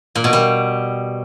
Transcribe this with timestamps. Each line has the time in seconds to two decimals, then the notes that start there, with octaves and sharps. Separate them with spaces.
0.15 A#2
0.24 B2
0.33 G3